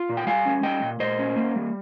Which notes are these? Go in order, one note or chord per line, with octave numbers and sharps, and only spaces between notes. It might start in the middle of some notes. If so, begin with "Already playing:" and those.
Already playing: F4
A#2
G5
G3 F5 G#5
C#4
G3 D#5 G5
A#2
A#2 C5 D#5
C#4
A#3
G3